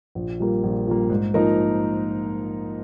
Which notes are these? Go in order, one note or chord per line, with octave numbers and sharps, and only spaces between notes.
A#1
A#2 G3 A#3
A#1
A#2 G3 A#3
G#2
F3 A#3 D#4 A#4